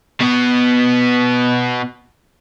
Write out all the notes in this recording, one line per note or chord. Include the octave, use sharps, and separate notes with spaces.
B2 B3